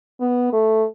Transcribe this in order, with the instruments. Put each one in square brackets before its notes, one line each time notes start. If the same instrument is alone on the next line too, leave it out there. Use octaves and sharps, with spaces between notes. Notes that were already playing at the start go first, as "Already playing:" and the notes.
[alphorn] B3
A3